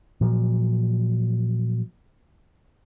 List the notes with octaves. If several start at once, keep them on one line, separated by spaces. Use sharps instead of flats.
A#2 F3 F#3